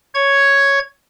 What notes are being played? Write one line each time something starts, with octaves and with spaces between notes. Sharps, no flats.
C#5 G#6